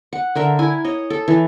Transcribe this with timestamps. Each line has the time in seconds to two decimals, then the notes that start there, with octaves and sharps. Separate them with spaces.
0.13 F#5
0.35 D3 A#4 E5
0.59 E4 G#5
0.84 C#5 D#5
1.10 A4
1.28 E3